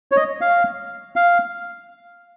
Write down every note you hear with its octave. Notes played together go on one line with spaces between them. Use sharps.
C#5
D#5
F5
F5